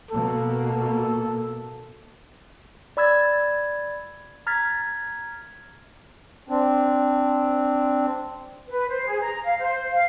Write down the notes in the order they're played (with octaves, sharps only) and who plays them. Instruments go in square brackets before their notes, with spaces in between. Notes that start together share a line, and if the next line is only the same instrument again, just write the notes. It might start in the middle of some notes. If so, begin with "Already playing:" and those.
[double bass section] B2 A#3 [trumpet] A4
[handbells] D5 B5 E6 G#6 A6
A#5 F6 G#6 A6 B6
[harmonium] C4 D4
[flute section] B4
C5
G#4
A#5
F5
C5
F5